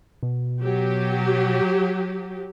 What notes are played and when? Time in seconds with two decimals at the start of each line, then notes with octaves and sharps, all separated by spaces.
0.23 B2
0.63 F#3 G4